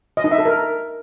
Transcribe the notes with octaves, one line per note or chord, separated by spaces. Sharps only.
D#5
D#4
E5
A4
A#4